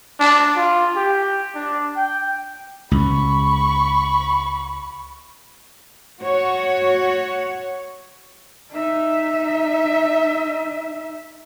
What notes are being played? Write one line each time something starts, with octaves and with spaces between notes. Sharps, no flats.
D4
F4
G4
D4
G5
C#2 B5 C#6
F#4 C#5
D#4 E5